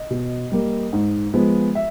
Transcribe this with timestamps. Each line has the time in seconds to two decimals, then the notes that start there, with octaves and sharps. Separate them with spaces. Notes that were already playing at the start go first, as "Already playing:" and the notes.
Already playing: D#5
0.11 B2
0.52 G3 A#3
0.93 G#2
1.34 F3 G#3 B3
1.75 E5